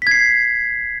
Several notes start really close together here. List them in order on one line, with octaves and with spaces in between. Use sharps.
B6 G#6 C7